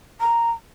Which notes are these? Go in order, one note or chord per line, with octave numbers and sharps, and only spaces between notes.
A#5